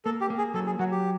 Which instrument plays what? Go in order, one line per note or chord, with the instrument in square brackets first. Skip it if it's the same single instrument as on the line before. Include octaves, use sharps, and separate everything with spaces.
[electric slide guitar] A#3 [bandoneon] A4
[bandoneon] G4
[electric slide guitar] A#3
[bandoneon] G#4
[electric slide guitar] F#3 [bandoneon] A4
[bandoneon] G#4
[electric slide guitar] F#3 [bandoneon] F#4
[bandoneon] G4